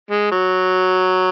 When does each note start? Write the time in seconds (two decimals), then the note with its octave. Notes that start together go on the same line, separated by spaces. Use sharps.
0.10 G#3
0.31 F#3